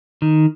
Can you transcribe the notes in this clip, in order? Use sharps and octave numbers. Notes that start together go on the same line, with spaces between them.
D#3